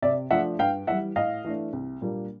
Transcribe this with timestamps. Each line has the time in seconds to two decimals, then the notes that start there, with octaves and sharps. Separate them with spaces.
0.02 C3 D5 E5
0.31 F3 A3 D4 E5 F#5
0.59 G2 F5 G5
0.87 E3 E5 F#5
0.92 G3
1.16 A2 D#5 F5
1.45 E3 A3 D4
1.73 C2
2.01 A#2 G3 A#3 D4